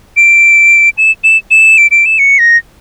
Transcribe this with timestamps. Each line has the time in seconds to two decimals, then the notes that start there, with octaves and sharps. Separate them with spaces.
0.17 D7
0.98 E7
1.24 E7
1.51 E7
1.78 D7
1.91 D7
2.06 E7
2.19 C#7
2.39 A#6